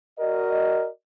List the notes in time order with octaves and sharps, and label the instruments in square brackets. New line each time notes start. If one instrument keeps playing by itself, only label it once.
[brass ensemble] F#4 A#4 D5 D#5